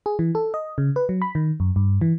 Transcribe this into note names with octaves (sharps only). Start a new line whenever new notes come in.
G#4
E3
A4
D#5
C#3
B4
F#3
B5
D#3
F#2
G2
E3